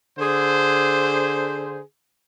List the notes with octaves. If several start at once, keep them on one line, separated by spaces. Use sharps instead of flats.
D3 G#4 C5